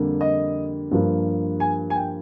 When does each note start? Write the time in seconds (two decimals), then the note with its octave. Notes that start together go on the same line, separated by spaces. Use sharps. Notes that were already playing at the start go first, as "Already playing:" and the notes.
Already playing: F2 D3 G3 A#3
0.21 D#5
0.91 G2 F3 A#3
1.60 G#5
1.90 G#5
1.96 G5